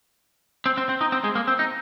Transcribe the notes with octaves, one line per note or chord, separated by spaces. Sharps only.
C4
C4
C4
D#4
C4
G#3
A#3
C4
D#4